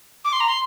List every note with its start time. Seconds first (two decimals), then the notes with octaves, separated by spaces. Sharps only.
0.25 D6
0.33 C6
0.40 A#5
0.48 C6